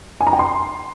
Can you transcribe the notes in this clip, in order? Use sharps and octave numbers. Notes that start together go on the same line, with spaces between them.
G#5
A#5
G5
C6